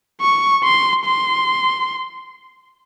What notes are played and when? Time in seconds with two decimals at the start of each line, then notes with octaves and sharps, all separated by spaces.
0.21 C#6
0.64 C6
1.05 C6